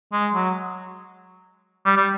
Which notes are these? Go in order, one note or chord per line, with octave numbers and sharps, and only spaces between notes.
G#3
F#3
G3
G3